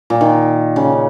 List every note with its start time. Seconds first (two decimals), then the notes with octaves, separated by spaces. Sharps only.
0.10 A#2
0.21 D#3
0.76 C#3